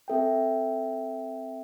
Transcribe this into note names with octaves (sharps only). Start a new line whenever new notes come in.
C4 A4 E5 G5